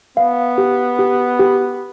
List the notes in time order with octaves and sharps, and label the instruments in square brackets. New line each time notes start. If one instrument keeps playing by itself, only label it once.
[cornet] B3 [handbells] F5
[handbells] G4
G4
G4